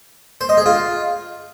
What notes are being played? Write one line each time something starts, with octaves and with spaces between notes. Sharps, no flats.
C5
D#5
G#4
F4